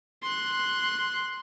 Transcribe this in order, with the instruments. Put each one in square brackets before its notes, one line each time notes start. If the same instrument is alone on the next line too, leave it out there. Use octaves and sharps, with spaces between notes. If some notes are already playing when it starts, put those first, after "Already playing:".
[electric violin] C6 F#6